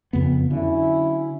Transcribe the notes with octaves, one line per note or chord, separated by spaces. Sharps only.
F2 C#3 B3
D3 F#3 C#4 E4